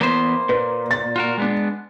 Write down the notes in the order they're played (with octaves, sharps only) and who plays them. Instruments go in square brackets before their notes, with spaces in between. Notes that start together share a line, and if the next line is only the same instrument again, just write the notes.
[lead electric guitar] E2 B3 [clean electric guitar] A#3 C5
[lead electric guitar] A#2 [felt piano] B4
[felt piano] A6
[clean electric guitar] F4 F#4 A#4
G#3 B3 D4